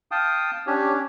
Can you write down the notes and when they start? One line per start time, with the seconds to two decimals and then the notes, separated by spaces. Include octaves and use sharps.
0.11 F5 G5 A5 D#6
0.67 C#4 D4 G4 C#5